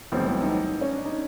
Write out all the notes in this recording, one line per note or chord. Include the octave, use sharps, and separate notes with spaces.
B1 A2 E3 G3 B3 C4
C4
D#4
C#4
D4
D#4